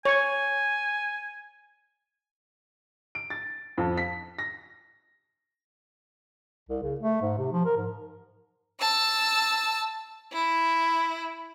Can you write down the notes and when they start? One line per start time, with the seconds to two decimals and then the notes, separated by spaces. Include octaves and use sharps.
0.05 C#5 G#5
3.15 D7
3.30 A6
3.78 F2
3.98 B6
4.39 A#6
6.69 C2
6.83 C#3
7.00 A3
7.22 G#2
7.38 C3
7.52 F3
7.65 A#4
7.77 G#2
8.81 A5 E6
10.32 E4